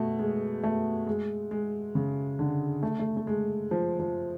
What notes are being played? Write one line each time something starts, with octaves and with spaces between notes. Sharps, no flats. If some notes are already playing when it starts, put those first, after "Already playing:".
Already playing: B2 A3
G#3
A3
G#3
G#3
C#3
D3
A3
A3
A3
G#3
F3
F3